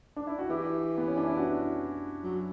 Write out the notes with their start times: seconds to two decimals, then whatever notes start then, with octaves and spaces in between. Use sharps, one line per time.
0.16 D4
0.27 E4
0.39 F#4
0.50 E3 E4 G4
0.98 B3
1.08 C#4
1.17 D4
1.27 E4
1.37 D4 F#4
2.24 F#3